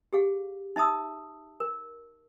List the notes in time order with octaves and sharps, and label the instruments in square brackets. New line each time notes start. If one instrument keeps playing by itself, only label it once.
[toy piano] G4 G#4 F5
D#4 E5 A5 D#6 E6
A#4